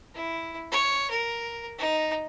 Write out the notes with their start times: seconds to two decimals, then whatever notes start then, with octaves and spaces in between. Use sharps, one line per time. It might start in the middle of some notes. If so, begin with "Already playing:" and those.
0.14 E4
0.71 C#5
1.10 A#4
1.78 D#4